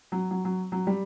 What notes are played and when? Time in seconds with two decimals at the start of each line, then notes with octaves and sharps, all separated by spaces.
0.12 F#3
0.31 F#3
0.45 F#3
0.72 F#3
0.87 G3